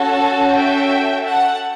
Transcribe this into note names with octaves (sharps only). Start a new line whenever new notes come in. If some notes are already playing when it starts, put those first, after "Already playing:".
Already playing: C#4 F#4 A4 F#5 A5
E5 G5
F#5 A5